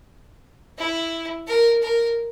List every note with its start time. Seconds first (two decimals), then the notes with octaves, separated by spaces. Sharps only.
0.77 E4
1.47 A#4
1.82 A#4